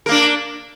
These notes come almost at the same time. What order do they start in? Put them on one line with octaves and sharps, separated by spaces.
A#4 A#3 D4